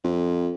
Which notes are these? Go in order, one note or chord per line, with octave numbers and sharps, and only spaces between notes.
F2